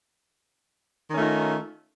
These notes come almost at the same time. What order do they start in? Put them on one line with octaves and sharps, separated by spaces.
D#3 C#4 A3 F4 D#4